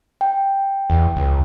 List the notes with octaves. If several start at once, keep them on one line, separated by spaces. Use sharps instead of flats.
G5
E2
C#2